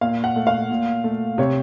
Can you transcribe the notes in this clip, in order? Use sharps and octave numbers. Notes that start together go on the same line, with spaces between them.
A#2 F5
F#5
A3
F5
A#2
A3
C3 C#5